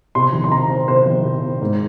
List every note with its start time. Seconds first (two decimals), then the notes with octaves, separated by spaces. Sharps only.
0.15 C3 C6
0.33 D#3
0.44 C6
0.51 C3 A#5
0.69 C4
0.88 C3 C5
1.06 D#3
1.25 C3
1.42 C4
1.61 G#2